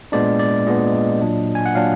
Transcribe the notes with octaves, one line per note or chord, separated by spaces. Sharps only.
A#2 G#3 B3 D4 D5
D5
A#2 G#3 B3 D4 D#5
A#2 F#3 D4
G#5
F#5
A#2 F#3 D4 F5